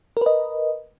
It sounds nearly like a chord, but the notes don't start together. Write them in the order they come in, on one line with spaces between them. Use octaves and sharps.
A#4 B4 D#5